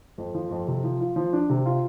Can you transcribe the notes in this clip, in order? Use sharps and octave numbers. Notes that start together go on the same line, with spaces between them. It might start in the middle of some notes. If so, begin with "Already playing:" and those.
F2
F3
F2
C3
F3
F4
F3
D4
C3
F4